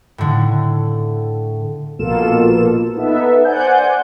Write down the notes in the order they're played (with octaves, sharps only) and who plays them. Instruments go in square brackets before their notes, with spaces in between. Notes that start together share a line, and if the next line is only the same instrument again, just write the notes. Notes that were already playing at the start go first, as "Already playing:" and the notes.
[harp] A2 D3
[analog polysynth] A#1 B2 A#3 F4 A4 E7
B3 D#4 A4 E5
C5 D5 F#5 G#5 G6